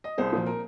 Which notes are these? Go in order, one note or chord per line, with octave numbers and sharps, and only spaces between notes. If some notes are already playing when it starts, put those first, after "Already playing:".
D#5
C2 G#4 C5
A#2 F3 C5
A#4